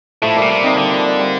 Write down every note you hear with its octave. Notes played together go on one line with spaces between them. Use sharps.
A2 F3 A3
G3 A#3
A#2
C3
C4 D#4
D3 G3
F3
G3
G3